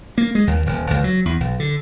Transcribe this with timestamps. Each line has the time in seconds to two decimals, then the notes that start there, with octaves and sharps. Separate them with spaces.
0.18 A#3
0.35 G#3
0.47 D#2
0.66 D#1
0.90 C#2
1.04 F#3
1.25 E2
1.40 B1
1.59 D3